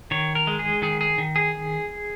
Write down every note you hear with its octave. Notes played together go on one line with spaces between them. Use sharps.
D#3 C#5
A#4
G#3
G#4
D#3 G#4
G#4
D#3
G#4